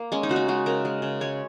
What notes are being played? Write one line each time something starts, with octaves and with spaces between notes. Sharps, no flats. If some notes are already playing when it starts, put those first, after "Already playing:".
Already playing: A#3
G#3 C#4
D#4
C#3 F#4
D#4
G#3 F#4
C#3 A#4
G#3
C#3
G#3 C#5